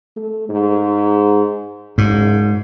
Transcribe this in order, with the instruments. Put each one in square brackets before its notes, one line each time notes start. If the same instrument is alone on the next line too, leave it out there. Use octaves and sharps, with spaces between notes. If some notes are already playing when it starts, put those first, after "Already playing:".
[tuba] A3
G#2
[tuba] F#1 [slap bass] G#2